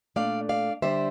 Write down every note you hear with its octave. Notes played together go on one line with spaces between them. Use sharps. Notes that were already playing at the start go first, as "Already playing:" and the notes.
A#2 A3 D4 D5 F5
D5 F5
D3 G3 D4 C5 E5